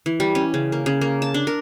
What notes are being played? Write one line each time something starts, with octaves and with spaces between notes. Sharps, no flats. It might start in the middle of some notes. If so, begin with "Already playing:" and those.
E3
G3
C#4
C#3
A#3
C#3
A#3
A5
D4
A#4